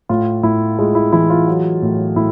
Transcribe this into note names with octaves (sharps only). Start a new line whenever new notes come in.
A2 F4
A2 E4
G#3 F4
E4
E3 E4
F4
F#3
A2
A2 E4